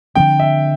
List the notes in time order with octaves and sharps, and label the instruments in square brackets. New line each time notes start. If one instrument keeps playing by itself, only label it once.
[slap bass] D3 F3 C4 [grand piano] G5
[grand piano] E5